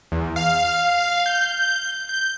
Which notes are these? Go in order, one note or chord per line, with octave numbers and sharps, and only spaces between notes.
E2
F5
G6
G6